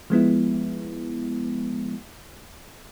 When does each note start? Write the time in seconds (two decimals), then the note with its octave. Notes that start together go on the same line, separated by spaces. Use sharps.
0.10 F3 G#3 B3 E4